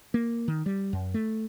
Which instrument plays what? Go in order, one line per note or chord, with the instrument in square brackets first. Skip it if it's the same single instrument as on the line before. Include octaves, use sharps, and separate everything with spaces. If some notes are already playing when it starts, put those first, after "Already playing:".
[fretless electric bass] A#3
D#3
G3
F#2
A3